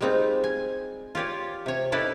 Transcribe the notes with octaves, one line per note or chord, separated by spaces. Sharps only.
G3 G#3 C4 D#4 F4
G#5
F4 G4 C#5 D5
C3 C#5
C#4 D#4 E4 A4 B4 D5